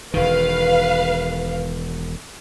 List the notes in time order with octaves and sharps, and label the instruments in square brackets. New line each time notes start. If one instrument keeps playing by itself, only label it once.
[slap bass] E1 D#3 [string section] B4 F5